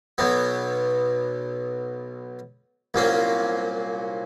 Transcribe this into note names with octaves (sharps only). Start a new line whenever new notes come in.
B1 B2 F#3 B3
C2 A#2 F#3 A#3 C#4